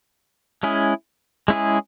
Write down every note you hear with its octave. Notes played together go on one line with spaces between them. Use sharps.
G#3 C#4 E4 G#4
G#3 C#4 E4 G#4